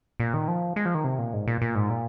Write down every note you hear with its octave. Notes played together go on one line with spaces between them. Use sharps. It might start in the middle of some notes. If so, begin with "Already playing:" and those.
A#2
D#3
F3
G#3
F3
D#3
C3
A#2
G#2
A#2
A#2
G#2
A#2